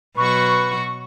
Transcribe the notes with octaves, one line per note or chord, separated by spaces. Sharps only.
B2 F#3 F#4 B4 C#6